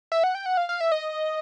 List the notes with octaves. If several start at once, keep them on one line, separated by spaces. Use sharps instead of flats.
E5
F#5
G5
F#5
F5
F5
E5
D#5